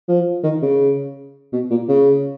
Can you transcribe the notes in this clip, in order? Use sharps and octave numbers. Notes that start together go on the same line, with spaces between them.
F3
D#3
C#3
B2
A#2
C#3